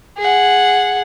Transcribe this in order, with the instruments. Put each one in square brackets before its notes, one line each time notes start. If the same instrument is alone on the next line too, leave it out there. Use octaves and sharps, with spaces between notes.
[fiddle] G#4 F#5